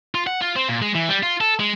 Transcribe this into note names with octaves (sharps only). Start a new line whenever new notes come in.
F4
F#5
F4
C4
A#2
G#3
E3
G3
F4
A4
G#3